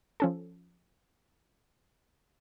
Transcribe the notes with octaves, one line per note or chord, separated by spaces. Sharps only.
F3 C#4 A4